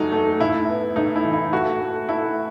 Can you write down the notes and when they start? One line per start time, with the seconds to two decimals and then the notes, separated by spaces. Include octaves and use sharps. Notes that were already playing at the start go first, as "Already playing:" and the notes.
Already playing: E2 F#3 A3 D#4 F#4
0.12 A3
0.40 A2 E4
0.69 B3
0.96 A2 D#4
1.16 E4
1.25 E3
1.33 E4
1.53 A3 F#4
1.81 A3
2.08 A3 E4